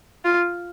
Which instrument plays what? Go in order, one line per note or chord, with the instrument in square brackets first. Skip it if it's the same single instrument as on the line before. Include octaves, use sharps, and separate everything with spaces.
[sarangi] F4